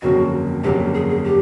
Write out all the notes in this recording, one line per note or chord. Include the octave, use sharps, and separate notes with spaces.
G1 F2 C#3 F#3 A#3 F#4
G1 F2 C#3 F#3 A#3 G4
G#4
G#4
G4